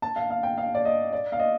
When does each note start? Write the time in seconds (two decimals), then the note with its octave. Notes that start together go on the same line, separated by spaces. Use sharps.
0.02 A5
0.16 F5
0.30 F5
0.43 G5
0.57 F5
0.75 D5
0.85 D#5
1.13 D5
1.32 F5
1.40 D#5